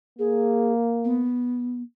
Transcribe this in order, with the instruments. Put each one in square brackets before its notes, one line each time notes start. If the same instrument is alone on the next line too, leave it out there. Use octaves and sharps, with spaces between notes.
[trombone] A#3 [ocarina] G#4
[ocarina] B3